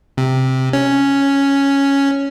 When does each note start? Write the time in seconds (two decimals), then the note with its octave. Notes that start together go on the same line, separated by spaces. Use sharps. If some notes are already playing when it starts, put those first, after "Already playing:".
0.17 C3
0.73 C#4